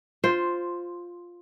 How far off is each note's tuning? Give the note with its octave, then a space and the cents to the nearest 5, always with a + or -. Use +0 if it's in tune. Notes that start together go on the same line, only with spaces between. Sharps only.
F4 +5 C5 +0